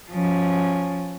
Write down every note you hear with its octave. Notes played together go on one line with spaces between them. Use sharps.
F3 C#4